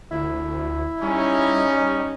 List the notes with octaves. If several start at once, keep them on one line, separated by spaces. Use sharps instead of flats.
D2 E4
G3 C#4 D#4